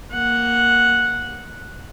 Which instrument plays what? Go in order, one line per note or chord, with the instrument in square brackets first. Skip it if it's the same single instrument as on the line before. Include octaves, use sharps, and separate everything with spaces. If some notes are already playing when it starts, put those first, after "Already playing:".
[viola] A#3 F#5